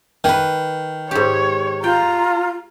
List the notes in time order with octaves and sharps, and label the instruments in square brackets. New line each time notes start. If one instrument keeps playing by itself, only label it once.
[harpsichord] D#3 [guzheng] B4 G#5
[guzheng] G#2 G4 [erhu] C#5
[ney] F4 [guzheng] G5 [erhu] A#5